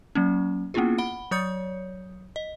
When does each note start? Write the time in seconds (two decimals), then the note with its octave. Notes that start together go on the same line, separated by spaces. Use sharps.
0.15 F#3 A#3 C#4
0.74 A#3 B3 C#4 E4 F4 G#4
0.98 F#5 B5 G7
1.31 F#3 C#5 D#6 G6 C#7
2.36 D#5